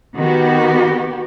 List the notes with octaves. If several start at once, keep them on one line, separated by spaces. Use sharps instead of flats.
D#3 B3 F#4 G4